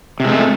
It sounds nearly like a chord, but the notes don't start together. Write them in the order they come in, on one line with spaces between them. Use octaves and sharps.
C3 G#3 A3